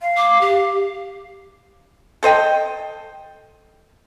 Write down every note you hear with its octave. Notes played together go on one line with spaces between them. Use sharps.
F5
D6
G4
A4 C5 D#5 G5